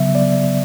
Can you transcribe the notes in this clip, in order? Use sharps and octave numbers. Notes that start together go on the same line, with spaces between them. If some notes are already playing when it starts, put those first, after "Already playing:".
Already playing: C#3 F#3 B3 E5
C#3 F#3 B3 D5